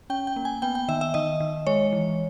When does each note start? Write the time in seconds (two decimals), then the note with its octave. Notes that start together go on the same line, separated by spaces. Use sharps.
0.10 C#4 G5
0.27 G5
0.36 A#3
0.45 G#5
0.62 B3 G5
0.75 G5
0.88 D#3 E5
1.01 E5
1.14 D#3 D#5
1.40 D#3
1.67 G#3 C#5
1.92 E3